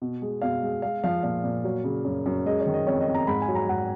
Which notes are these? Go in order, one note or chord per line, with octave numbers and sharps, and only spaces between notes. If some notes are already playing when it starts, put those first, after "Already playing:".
B2
G#3
B2 F5
G#3
G#3 F5
F3 F5
A#2 F5
A#2
F#3
C#3
F#2
F#2
G#3 D#5
C#5
D#3
D#5
F2 C#5
D#5
F2
A#5
G#2 B5
G#5
F#3
A#5
G#2 F#5